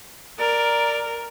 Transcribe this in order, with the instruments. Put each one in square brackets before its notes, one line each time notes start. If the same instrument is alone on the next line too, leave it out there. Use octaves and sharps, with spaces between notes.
[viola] A#4 [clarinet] D5